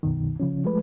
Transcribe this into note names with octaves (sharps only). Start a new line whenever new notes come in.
C2 F#2 B2 D#3
C#3 F3 C#4
F3 G#3 A3 B4